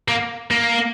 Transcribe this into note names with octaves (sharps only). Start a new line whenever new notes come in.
A#3
A#3